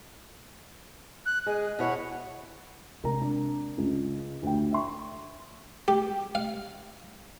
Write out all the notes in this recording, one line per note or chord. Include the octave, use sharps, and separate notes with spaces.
F#6
G#3 G#4
B2 E4 C#5 F#5
C3 G#3 A#4 A#5
D4
C#2
D2 G5
E5 C6 C#6
G4
F5